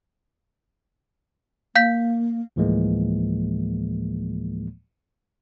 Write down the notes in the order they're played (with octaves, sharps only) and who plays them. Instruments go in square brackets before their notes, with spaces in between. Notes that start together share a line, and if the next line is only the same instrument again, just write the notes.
[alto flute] A#3 [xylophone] F5 G6 B6
[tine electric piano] D2 A2 E3 F3 G#3 A#3